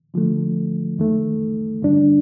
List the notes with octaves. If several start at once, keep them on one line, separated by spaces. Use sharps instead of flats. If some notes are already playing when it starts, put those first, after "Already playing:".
D3 F3 A3
F2 D#3 A3
G2 D3 G3 D4